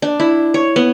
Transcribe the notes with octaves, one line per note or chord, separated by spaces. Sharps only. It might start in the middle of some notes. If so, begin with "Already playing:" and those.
D4
E4
C#5
B3